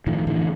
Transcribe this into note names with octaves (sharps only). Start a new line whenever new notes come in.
A2 D#3 F3
A2 D3 E3